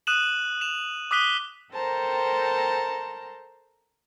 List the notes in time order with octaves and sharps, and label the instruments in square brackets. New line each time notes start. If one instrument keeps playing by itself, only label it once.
[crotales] D#6 F#6 D#7 E7 F#7
E7 F7
D6 D#6 F#6 B6 D#7 G7
[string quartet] A4 A#4 C5 G5 A5 A#5